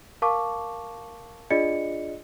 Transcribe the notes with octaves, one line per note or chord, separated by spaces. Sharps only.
A#4 F5 A5 C#6 D6
D4 F4 G#4 D5 D#5 C#7